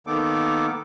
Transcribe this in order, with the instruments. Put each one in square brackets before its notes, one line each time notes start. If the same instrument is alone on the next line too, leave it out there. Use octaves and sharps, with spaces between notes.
[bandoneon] D#3 A#3 B3 D#4 A4 D6